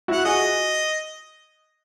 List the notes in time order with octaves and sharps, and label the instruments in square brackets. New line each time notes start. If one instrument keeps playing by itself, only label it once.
[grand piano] E4 F#4 [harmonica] F#5
[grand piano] F#4 G#4 [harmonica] D#5